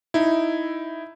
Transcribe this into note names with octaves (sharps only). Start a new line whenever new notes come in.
D#4 E4